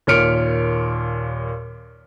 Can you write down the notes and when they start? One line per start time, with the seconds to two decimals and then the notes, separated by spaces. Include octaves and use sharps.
0.07 D#2 A#2 C#5 F6 C#7 D7